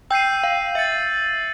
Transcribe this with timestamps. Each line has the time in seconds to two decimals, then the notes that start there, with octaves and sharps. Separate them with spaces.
0.10 G5 E6 G6 C7 D#7
0.44 F5
0.75 E5 A6 C#7 F#7